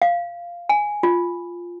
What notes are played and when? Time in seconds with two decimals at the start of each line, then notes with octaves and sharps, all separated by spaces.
0.02 F5
0.69 G#5
1.03 F4